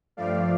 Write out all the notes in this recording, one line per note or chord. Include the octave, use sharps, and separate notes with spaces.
G2 F3 A3 D5 F5